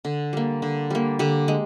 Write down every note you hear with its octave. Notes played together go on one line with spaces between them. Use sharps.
D3
G3 A#3
D3
G3 A#3
D3 G4
G#3